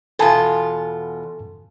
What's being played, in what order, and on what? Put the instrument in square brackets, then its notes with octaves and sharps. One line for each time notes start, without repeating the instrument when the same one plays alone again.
[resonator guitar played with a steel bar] E2 B2 F4 [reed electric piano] A4 G#5 A5